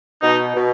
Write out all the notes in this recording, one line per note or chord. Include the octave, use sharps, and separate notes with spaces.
B2 D#4
B2